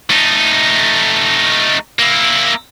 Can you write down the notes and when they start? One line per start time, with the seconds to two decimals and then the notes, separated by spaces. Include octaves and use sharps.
0.10 A3 D#4
1.99 A#3 E4